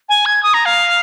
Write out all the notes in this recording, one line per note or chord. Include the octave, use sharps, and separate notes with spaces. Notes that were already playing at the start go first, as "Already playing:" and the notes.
G#5
G#6
D#6
A#5
F5